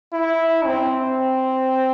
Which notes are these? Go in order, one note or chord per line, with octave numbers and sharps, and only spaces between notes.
E4
C4